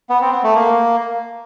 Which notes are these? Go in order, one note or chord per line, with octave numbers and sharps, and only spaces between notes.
B3
C4
B3
A3
A#3